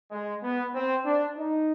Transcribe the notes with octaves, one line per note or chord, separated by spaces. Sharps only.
G#3
B3
C4
D4
D#4